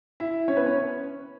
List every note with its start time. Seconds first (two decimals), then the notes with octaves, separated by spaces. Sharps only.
0.20 E4 E5
0.48 C#4 C#5
0.57 B3 B4
0.66 C#4 C#5